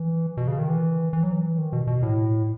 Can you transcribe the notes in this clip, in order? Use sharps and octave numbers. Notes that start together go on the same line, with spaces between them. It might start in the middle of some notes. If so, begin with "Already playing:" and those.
Already playing: E3
B2
C#3
D#3
E3
E3
F#3
E3
D#3
B2
B2
A2